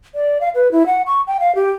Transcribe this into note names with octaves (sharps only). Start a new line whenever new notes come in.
D5
F5
B4
E4
F#5
C#6
G5
F5
G4